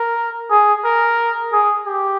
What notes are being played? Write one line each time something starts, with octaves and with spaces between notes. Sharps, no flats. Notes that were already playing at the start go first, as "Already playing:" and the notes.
Already playing: A#4
G#4
A#4
G#4
G4